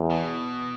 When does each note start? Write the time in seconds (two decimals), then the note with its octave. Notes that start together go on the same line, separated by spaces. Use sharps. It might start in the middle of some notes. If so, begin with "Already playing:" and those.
Already playing: E2
0.10 B2